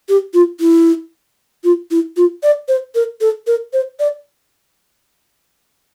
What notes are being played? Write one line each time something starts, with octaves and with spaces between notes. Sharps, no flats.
G4
F4
E4
F4
E4
F4
D5
C5
A#4
A4
A#4
C5
D5